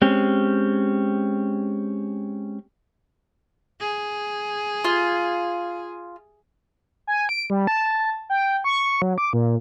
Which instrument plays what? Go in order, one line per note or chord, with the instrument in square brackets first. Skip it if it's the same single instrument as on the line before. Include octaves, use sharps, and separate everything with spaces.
[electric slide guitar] G#3 C4 C#4 G4
[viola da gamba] G#4
[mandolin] F4
[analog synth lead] G#5
D7
G3
A5
G5
C#6
F#3
D6
A#2